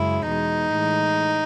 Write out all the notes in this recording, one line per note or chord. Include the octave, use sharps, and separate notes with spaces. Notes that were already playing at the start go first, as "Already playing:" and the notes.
Already playing: F#2 C#3 G#3 E4
E2 B2 G#3 D#4
A2 E3 G#3